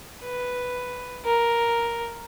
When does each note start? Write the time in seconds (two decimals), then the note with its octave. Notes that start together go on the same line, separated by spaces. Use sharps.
0.22 B4
1.25 A#4